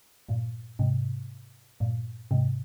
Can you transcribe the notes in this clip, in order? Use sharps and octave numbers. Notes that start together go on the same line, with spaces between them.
G2 A#2
G#2 C3
G2 A#2
G#2 C3